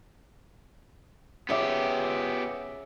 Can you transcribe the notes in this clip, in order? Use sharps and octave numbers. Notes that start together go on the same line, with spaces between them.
C#3 B3 G4 E5